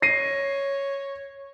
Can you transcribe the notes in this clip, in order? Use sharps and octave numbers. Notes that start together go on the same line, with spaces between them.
C#5 A#6 C7 D#7